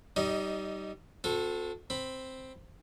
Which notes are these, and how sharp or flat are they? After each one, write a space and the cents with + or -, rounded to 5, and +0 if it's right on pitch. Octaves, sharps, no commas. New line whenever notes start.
G3 -20 D#4 +0 D#5 +15
C4 -35 F#4 -45 A4 +0
C4 +0 B5 +0